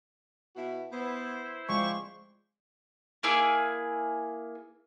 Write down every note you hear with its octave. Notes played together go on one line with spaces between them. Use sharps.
B2 E4 F#4
B3 E4 C5
G#3 C4 F4 D5 C#6
A#3 E4 G#4 D#6